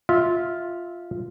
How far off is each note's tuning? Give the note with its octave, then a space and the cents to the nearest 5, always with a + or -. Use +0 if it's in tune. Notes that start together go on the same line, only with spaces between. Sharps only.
F4 +0 E5 -15